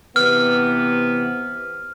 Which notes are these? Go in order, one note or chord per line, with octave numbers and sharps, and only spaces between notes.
C3 E3 B3 F6